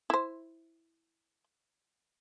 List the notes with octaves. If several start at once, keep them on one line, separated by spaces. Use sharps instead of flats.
E4 C5